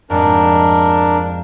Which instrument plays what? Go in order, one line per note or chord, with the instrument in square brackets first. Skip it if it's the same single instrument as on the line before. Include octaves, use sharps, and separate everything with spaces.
[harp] F2 G#2 G#3 [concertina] D4 A#4